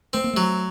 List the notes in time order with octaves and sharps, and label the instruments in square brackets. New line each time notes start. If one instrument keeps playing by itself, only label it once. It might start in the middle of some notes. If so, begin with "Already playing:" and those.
[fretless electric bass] A3 [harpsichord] C4
[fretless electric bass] A#3
[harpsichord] F#3 [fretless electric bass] A3